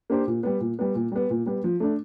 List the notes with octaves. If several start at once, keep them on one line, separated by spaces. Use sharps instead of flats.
A#3 D4 G4 C5
A#2
G3 B3
A#2
G3 B3
A#2
G3 B3
A#2
G3 B3
F3
A3 D4